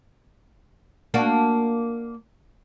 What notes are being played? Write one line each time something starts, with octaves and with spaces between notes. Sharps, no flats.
A#3 D4 F#4